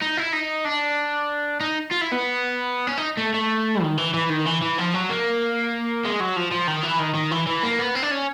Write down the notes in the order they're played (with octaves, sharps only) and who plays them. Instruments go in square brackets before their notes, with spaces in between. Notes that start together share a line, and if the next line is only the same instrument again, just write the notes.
[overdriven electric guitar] D#4
E4
D#4
D4
D#4
F4
E4
B3
C#4
D#4
A3
A3
D#3
E3
E3
D#3
E3
E3
F3
F#3
A#3
G#3
F#3
F3
F3
D#3
E3
D#3
D#3
E3
E3
A#3
B3
C4
D4
C#4